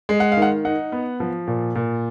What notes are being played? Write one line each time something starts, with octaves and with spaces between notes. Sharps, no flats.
G#3
F#5
F5
D#3
F#5
D#4 F#5
B3
F3
A#2
A#2